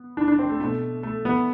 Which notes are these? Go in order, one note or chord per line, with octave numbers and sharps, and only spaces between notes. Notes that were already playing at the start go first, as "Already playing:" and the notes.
Already playing: B3
D4
D4
C4
A3
B2 A3
A3
B3